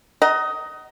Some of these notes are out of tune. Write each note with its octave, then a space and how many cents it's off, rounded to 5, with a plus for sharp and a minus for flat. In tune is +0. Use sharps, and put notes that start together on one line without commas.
D#5 +15 F#5 +35 A#5 +0